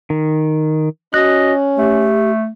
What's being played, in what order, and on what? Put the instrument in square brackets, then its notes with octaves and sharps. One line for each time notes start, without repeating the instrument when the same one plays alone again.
[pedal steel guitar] D#3
[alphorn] C#4 [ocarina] F#4 [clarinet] D#5 [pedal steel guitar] F#6
[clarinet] A3 [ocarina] G4